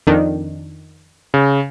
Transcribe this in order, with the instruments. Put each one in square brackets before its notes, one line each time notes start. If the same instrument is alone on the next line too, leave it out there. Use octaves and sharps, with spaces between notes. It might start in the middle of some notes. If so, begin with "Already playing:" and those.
[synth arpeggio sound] F2 D#3 D4
[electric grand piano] C#3